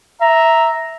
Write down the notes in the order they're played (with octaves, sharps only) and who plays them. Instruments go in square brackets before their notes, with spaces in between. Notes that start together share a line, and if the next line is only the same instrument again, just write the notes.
[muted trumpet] E5 [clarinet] A#5